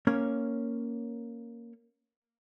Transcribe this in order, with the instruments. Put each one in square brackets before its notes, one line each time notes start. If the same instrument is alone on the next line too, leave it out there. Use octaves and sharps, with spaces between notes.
[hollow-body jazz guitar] A#3 C#4 C#5